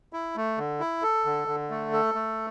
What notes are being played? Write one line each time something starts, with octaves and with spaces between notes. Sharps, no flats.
E4
A3
D3
E4
A4
D3
D3
A3
A4
A3